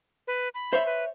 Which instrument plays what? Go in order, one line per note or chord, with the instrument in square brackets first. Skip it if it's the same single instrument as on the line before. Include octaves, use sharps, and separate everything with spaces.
[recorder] B4
B5
[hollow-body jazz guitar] C5 C#5 E5
[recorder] B4